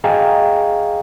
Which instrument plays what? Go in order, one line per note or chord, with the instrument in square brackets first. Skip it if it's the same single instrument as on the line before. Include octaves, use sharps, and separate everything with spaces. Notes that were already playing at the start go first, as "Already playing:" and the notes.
[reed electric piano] G#4 D#5 F5 G5 G#5 A#5